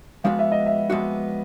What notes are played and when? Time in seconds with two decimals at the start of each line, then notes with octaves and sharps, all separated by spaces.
0.24 F3 G#3 B3 D4 F#4 F5
0.39 E5
0.52 D#5
0.66 E5
0.90 F3 G#3 B3 D4 F#4 E5